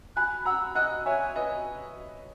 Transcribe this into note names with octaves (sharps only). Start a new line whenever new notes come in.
G#5 B5 F#6
F#5 A#5 E6
D#5 F#5 F#6
C#5 E5 G#5
B4 D#5